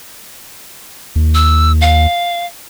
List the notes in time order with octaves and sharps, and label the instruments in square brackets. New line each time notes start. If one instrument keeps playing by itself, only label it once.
[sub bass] D#2
[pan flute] E6
F5